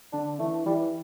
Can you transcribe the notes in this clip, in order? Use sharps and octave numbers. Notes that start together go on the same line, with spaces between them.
D3 D4
E3 A3
E3 G3